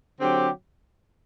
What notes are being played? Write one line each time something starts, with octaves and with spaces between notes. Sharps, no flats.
D3 F#3 C4 G4